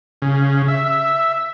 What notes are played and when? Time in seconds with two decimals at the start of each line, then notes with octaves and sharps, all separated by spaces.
0.22 C#3
0.68 E5